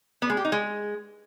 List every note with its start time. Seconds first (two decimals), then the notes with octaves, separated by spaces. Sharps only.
0.22 B3
0.30 G#3
0.37 G4
0.45 D#4
0.52 G#3